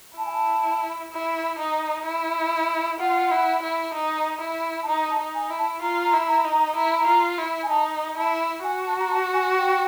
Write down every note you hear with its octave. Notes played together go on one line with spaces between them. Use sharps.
E4 A5
G#5
A5
E4
D#4
E4
F4 F#5
E4
E4
D#4
E4
A5
D#4 A#5
A5
D#4
G#5
E4
A5
F4 A#5
A#5
E4
A#5
D#4
A#5
E4 A#5
A#5
F4
E4
G#5
D#4 A5
E4 A5
F#4 G#5
A5
A#5
A5
G#5
G5